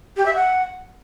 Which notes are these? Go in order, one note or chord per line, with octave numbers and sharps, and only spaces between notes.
G4
E5
F#5